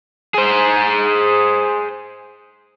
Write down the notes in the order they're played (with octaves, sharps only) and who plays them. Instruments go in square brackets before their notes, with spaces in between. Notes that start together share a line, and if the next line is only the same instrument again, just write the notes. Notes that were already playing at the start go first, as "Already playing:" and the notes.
[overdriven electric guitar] G#4 C5